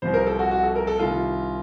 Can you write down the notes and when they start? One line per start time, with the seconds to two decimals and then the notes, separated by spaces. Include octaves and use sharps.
0.02 C2 C3 F3 C5
0.14 A#4
0.26 A4
0.39 F#4
0.51 F#4
0.63 A4
0.76 A#4
0.87 A4
0.99 C2 C3 D#3 F4